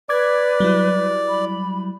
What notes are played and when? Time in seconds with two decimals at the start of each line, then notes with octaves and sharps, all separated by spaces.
0.09 B4 D5 D6 G#6
0.60 F#3 G3 E4
1.28 B5